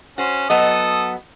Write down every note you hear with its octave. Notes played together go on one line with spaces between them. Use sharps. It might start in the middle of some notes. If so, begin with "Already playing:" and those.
C#4 F#4 C5
F#3 B3 A4 D#5 D#6